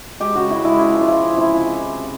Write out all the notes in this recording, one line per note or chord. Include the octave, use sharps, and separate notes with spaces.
G#3 G4
C#3 F#4
C#3 E4
G#3 E4
C#3 E4
F3
F4
F3 E4
C#3
C3 E4
F3